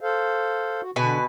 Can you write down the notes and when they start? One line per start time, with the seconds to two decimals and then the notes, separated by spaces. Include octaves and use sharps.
0.01 A4 C5 F5
0.82 F#4
0.96 B2 D3 B4 G#5